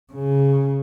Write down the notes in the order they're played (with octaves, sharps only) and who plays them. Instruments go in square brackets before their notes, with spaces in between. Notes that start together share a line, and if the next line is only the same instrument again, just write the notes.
[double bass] C#3